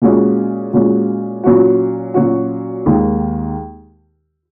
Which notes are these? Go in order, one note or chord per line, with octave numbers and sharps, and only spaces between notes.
A#2 G#3 C#4 F#4
A#2 G#3 C#4 F#4
A#2 F#3 C#4 F#4
A#2 F#3 C#4 F#4
D#2 D#3 G#3